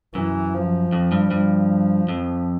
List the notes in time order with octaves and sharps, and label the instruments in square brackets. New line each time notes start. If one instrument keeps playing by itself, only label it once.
[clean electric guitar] F#2 [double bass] E3
[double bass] F3
[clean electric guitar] F2
G2
[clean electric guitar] G2 [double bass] F3
[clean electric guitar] F2